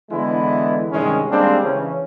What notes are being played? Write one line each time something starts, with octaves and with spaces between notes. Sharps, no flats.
D3 E3 G#3 B3 E4
G2 C3 D#3 G#3 C#4
G3 G#3 A#3 C4 D4
C#3 E3 C#4